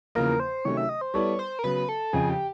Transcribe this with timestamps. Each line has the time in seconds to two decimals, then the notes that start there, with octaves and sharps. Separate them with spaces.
0.15 E2 C#3 F3 A#3 A#4
0.40 C5
0.65 C3 D#3 F#3 A3 C#4 C#5
0.77 E5
0.89 D#5
1.01 C5
1.14 G3 B3 E4 A4 C#5 D5
1.39 C5
1.59 A#4
1.64 C#3 F#3 B3 B4
1.89 A4
2.13 F2 C#3 F3 G#4
2.29 G4